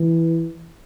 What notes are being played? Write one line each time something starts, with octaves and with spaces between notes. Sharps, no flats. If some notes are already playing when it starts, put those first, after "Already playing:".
Already playing: E3